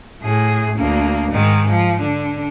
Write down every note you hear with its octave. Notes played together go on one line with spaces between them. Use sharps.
A2 G#4
D2 A#3
G#2 D#3
F3
D3